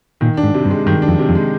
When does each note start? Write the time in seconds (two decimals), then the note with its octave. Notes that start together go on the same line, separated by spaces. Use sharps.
0.21 A#2 D#3
0.37 D4
0.43 G#2
0.54 C3
0.65 G2
0.71 G#3
0.86 G2 D#3
1.02 D4
1.08 F2
1.19 C3
1.29 F2
1.35 G#3